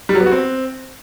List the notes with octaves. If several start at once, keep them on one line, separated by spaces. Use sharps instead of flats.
G3
F#3
B3
F#4
C4